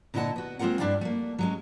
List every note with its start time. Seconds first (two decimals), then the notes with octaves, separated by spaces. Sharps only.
0.14 A#2 D3 E4 D#5 F#5 A5
0.36 B3 F#4
0.59 G#3 A#3 C4 F4 A#4 F#5
0.79 G2 D4 E4 D5 F5 G5
1.01 A3 A#3
1.39 F#3 G#3 C#4